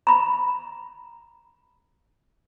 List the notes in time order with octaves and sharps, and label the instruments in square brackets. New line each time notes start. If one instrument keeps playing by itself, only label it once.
[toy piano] A#5 B5